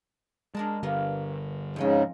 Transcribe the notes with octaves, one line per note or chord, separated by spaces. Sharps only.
G#3 D4 A#4 A5
G1 D3 G3 A#3 B3 A#4
F2 G#2 C#3 G#3 C#4